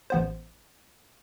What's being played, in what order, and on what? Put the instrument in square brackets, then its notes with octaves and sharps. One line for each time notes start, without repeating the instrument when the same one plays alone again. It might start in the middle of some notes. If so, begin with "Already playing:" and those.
[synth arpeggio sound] A1 B3 C5